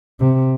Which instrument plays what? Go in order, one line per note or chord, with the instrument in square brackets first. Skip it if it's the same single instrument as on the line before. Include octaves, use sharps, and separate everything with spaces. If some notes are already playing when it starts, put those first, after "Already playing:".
[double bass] C3